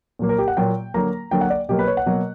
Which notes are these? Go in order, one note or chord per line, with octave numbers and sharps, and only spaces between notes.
A#2 F#3 A#3
A#4
G4
F#5
A#2 F#3 A#3 G5
D3 F#3 A#3 A#5
D3 F#3 A#3 G5
F#5
D5
B2 F#3 A#3 G4
B4
C#5
F#5
B2 F#3 A#3